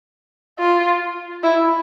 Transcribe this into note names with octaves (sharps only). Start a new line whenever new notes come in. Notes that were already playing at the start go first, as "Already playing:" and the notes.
F4
E4